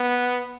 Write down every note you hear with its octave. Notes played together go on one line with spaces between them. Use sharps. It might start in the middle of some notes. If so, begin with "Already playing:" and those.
Already playing: B3